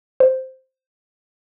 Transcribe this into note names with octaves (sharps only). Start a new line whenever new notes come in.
C5